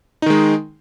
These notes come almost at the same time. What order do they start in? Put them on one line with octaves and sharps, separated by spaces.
D#4 D#3 G#3